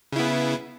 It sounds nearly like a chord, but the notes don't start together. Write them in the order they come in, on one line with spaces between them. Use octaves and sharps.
C#3 E4 B3